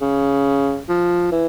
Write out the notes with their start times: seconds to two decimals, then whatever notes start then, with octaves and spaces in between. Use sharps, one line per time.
0.01 C#3
0.88 F3
1.32 E3